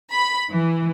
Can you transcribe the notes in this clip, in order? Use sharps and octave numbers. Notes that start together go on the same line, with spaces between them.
B5
E3